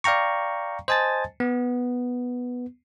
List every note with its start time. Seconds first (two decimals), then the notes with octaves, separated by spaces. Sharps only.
0.04 D5 F5 G5 A#5 C#6
0.88 C5 D#5 G#5 A5 A6
1.40 B3